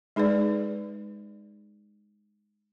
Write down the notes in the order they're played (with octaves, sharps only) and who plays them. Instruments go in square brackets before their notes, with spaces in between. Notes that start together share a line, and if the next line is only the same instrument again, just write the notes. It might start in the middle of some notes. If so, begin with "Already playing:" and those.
[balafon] G#3 D#4 G#4 B4 D5